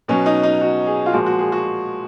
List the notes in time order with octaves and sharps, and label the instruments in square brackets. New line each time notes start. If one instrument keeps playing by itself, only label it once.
[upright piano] B2 F#3 C#4
D#4
D#4
F#4
G#4
F4
A#2 F3 G#3 F#4
F#4
G#4
F#4